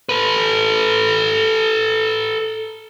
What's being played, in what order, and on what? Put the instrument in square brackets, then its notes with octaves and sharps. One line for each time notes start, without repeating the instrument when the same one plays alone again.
[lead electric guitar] A4 B4